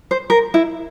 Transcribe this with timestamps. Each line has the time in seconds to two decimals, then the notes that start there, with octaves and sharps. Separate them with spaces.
0.11 C5
0.30 A#4
0.54 E4